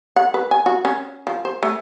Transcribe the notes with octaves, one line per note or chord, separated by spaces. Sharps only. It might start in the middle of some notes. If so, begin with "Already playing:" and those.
F#5
B4
G#5
F#4
C#4
F3
C5
A3